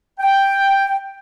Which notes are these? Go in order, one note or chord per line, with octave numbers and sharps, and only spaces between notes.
G5